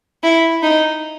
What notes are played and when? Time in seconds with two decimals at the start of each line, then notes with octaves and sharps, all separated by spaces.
0.23 E4
0.63 D#4